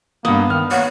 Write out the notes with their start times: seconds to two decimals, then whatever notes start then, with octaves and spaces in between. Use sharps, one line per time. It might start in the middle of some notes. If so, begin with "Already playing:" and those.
0.25 G2 A#3 B3 D#6
0.50 D#3 F6
0.71 A#3 C#5 F#5